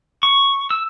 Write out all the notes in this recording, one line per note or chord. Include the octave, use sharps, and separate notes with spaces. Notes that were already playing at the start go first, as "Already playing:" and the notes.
C#6
E6